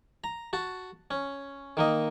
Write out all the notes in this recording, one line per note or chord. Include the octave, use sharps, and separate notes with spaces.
A#5
F#4 A5
C#4
D#3 A#3 D#5